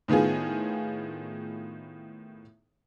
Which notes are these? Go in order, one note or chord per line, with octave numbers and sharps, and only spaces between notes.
A2 D#3 B3 F4 G#4